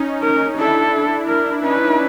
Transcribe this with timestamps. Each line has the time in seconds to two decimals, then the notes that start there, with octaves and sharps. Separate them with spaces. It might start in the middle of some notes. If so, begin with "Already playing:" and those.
Already playing: C#4 D#4
0.22 A#4
0.57 D4 E4 A4
1.28 A#4
1.62 C#4 D#4 B4